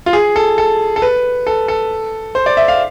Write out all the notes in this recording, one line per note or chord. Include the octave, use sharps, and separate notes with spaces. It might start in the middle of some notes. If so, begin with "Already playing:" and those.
F4
G#4
A4
A4
A4
B4
A4
A4
C5
D5
E5
F5